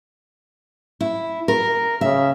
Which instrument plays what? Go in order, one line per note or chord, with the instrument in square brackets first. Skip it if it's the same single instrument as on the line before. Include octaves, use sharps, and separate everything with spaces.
[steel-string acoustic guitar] E4
A#4
[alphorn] C#3 [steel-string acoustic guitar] E5